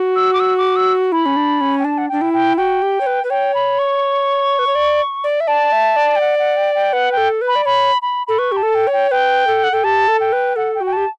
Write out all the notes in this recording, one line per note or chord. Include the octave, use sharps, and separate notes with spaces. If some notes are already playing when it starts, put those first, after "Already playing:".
Already playing: F#4
E6
D6
E6
D6
E6
E4 B5
C#4
D4
C#4
G5
D4 A5
F#5
D4 G5
E4
G5
F#4 G5
G4
C#5
B4
B4
C#5 G5
B5
C#6
B4
C#5
D5
D5
E5
D5 A5
E5
D5
G5
F#5
F#5
G5
G5
B4 F#5
G5
A4
B4
B5
D5
C#5 B5
B5
A4 B5
B4 C#6
G4
A5
A4
G5
C#5
G5
B4 G5
A4
F#5
A4 G5
G4 A5
A4
G5
B4
A4 F#5
G5
F#4
G5
G4 A5